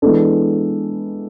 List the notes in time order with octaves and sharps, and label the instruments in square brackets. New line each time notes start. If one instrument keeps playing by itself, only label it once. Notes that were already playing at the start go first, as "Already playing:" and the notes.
[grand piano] E3 G#3 B3 D4 A4